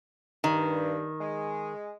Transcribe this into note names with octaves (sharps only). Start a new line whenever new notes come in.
G2 D#3
G#3